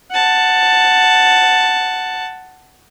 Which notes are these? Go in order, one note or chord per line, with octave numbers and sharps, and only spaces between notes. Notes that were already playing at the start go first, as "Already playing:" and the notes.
F#5 A5